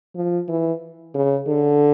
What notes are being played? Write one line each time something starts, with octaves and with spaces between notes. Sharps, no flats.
F3
E3
C#3
D3